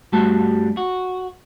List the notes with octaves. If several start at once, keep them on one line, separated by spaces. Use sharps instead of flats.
G2 G3 A3 F#4 A5
F#4